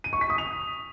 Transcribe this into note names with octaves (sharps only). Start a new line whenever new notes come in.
D#7
C#6
B6
D#6
F7